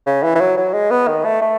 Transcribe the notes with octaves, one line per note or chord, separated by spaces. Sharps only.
C#3
E3
E3
F#3
F#3
G#3
B3
D#3
A3
A3